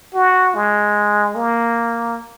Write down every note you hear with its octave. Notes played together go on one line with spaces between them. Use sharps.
F#4
G#3
A#3